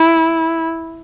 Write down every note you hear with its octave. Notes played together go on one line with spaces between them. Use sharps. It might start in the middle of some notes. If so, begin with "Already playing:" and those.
Already playing: E4